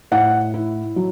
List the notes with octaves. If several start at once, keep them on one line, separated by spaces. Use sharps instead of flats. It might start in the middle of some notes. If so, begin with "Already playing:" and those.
A2 F#5
E4
F#3